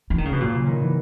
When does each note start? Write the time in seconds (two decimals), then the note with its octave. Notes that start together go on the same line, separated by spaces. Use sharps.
0.10 E3
0.18 D#3
0.25 C#3
0.32 B2
0.40 A#2 F#3
0.54 C#3
0.67 D#3
0.82 E3